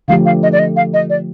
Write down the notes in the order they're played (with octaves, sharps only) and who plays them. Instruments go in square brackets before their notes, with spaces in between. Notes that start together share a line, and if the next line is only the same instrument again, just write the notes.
[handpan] D3 F3 A3 D4 G4 [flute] F5
[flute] F5
D#5
D5
D#5
F5
D#5
D5